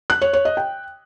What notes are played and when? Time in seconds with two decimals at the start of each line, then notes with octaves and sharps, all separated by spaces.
0.10 F#6
0.22 C#5
0.33 C#5
0.45 D#5
0.57 G5